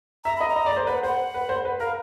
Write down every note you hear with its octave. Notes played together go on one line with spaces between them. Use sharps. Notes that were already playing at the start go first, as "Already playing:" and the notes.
E5 A#5
D#5 B5
A#5
D#5
D5
C5
B4 F#5
C5 F#5
B4
C5
B4
A#4 F5